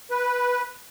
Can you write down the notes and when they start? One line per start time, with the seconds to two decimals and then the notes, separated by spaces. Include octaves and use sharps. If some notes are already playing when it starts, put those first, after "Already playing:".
0.11 B4